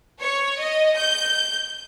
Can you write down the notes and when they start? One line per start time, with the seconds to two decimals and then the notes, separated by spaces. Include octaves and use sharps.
0.20 C#5
0.59 D#5
0.96 G6